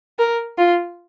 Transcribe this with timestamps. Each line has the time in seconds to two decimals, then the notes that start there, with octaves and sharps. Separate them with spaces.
0.19 A#4
0.58 F4